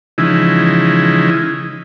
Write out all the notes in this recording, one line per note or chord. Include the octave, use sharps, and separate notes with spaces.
C#3 E3 F3 G#3 D#4 E4